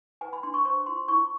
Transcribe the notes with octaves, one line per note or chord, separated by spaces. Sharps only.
B4 G#5
B5
D4 C6
C#6
C5 C#6
F4 C6
E4 C#6